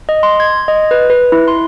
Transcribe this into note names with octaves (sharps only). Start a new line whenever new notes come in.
D#5
C6
G#6
D#5
B4
B4
E4
C6